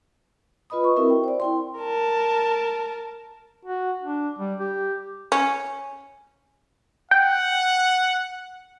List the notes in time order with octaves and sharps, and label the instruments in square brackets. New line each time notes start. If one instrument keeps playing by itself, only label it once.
[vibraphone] F4 B4 D#5 B5 D#6
C#6
C4 E4 F#4 A#4 E5
G5
C5 D5
E4 G5 C6
[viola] A#4 A5
[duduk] F#4
D4
G3
G4
[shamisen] C#4
[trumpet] F#5 [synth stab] G5